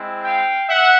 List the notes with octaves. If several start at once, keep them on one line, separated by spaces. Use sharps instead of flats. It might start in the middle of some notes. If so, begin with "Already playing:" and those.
Already playing: G#3 C4 E4
F5 G5
E5 F#5